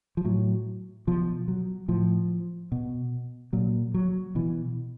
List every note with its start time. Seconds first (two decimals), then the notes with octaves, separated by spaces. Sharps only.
0.17 F3
0.25 A2 F#3
1.07 B2 F3
1.48 F#3
1.88 A2 F3
2.72 B2
3.53 A#2 F#3
3.94 F#3
4.35 B2 E3